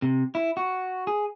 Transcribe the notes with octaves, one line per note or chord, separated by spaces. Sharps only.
C3
E4
F#4
G#4